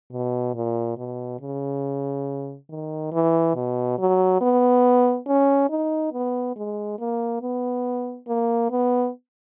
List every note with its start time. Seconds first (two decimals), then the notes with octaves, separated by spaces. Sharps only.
0.12 B2
0.54 A#2
0.97 B2
1.40 C#3
2.70 D#3
3.12 E3
3.55 B2
3.98 F#3
4.41 B3
5.27 C#4
5.70 D#4
6.13 B3
6.56 G#3
6.99 A#3
7.42 B3
8.28 A#3
8.71 B3